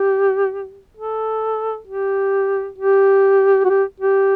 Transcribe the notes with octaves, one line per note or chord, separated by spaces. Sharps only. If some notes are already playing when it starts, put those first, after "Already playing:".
Already playing: G4
A4
G4
G4
F#4
G4
G4